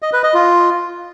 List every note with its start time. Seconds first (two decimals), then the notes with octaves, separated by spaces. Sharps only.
0.02 D#5
0.13 B4
0.23 D#5
0.34 F4